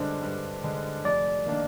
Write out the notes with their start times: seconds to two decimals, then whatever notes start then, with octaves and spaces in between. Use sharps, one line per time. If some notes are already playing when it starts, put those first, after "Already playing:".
Already playing: G2 D3 G#3 D4 C5
0.23 G2
0.64 D3 G#3 D4
1.05 F1 D5
1.46 D#3 A#3 D4